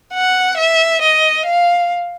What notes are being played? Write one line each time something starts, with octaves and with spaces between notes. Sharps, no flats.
F#5
E5
D#5
F5